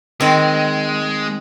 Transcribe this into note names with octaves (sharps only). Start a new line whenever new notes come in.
D#3 G#3 C4